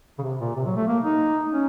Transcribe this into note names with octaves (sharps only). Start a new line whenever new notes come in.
C#3
C3
A#2
C3
F#3
A3
A#3
D#4
C#4